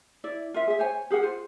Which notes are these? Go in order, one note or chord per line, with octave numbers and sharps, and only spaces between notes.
E4 D5
F4 A#4 E5
G#4 E5
C5 C#5 G#5
G4 G#4 A#4 F#5
F4 C5